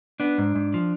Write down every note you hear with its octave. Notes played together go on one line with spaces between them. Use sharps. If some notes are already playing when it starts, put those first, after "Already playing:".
B3 D4
G#2
G#2
F3